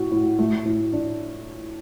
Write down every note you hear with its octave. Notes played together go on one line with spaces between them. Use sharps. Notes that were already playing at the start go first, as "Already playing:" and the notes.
Already playing: A2 F#4
A2
A3
A2
D4